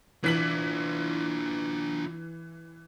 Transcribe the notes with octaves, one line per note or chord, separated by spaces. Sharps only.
E3 D4 F4 B6 F#7